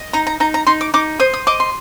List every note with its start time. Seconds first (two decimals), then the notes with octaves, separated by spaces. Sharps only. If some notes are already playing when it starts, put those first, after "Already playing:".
Already playing: D#5
0.13 D#4 A#5
0.27 A#5
0.40 D#4 A#5
0.54 A#5
0.67 D#4 C6
0.81 D6
0.94 D#4 D6
1.20 C5 D#6
1.34 D#6
1.47 D#5 D6
1.60 C6